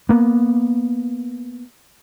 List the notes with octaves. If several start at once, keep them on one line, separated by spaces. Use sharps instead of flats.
A#3 B3